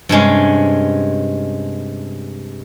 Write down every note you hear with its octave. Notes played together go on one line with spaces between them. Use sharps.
G2 C3 G#3 C#4